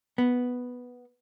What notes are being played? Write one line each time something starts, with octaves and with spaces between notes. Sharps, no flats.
B3